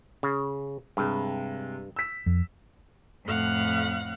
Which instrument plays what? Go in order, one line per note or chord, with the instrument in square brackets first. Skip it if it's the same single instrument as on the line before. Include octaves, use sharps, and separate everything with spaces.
[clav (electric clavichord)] C#3
[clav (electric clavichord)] G2 [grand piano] C3 G#3
[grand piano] E6 B6
[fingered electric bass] F2
[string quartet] F2 A2 F5 F#5 F#6